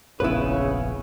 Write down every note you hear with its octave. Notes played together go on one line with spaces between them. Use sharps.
F1 A#1 C#3 B3 E4 B4 C#5